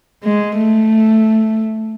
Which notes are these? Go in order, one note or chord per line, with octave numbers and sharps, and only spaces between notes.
G#3
A3